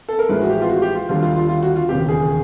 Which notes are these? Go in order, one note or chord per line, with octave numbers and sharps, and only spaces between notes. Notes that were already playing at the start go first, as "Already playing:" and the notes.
A4
A#4
A1 A2 F3 G#3 B4
F#4
G4
F4
F#4
G4
F4
D#2 D3 G3 F4
F4
F4
F4
F#4
F4
E1 D#2 C#3 G4
G#4